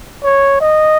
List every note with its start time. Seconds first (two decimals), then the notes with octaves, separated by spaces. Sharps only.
0.24 C#5
0.61 D#5